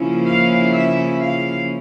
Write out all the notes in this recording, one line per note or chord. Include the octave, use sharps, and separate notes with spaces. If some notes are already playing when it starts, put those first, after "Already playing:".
Already playing: C#3 F3 A#3 C#4 E4
F5
E5
F5